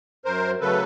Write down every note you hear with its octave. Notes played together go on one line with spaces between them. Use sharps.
F#2 A#4 C5
C#3 F#3 A3 A4 B4